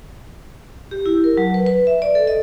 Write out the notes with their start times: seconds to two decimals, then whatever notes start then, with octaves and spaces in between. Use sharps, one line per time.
0.91 G4
1.06 E4
1.24 A#4
1.37 F#3
1.54 B4
1.66 B4
1.87 E5
2.02 D5
2.15 A4
2.27 D#5